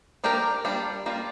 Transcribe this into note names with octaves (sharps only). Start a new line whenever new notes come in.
F3 A#3 D4 G4 A#4
G3 A#3 D4 F4
G3 A#3 D4 F4